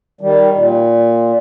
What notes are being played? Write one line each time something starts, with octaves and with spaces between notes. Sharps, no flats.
D#3 G3
A#2